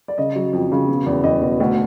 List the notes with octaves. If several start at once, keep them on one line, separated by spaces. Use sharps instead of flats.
D5
C#3 D#5
F#3
F2
C#3
B2
E2
E2 D#5
B2
D2